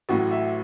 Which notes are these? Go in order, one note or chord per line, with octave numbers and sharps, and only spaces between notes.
A1 A2 F#3 F#4
E5